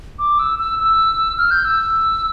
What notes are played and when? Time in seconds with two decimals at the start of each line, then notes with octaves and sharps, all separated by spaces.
0.19 D6
0.39 E6
0.59 E6
0.79 E6
1.38 F6
1.51 G6
1.64 E6